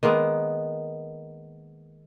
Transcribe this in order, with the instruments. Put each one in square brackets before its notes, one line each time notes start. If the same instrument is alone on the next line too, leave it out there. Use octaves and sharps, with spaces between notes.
[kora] D#3 G#3 A#3 B3